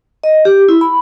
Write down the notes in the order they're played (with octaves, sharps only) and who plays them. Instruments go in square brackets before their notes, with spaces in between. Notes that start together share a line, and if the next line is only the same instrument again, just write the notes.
[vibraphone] D#5
G4
E4
B5